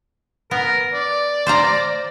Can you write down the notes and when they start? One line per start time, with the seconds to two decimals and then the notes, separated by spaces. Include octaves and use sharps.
0.51 B3 A#4
0.93 D5
1.47 C5 F5 A#5